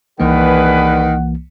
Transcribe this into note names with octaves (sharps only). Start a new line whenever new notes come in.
C2 G2 D#3 E3 A#3 G#4 B4 F#5